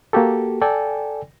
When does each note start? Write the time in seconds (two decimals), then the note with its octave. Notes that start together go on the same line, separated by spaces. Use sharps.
0.13 A#3 F#4 G4 A4
0.61 A4 D5 G5 G#5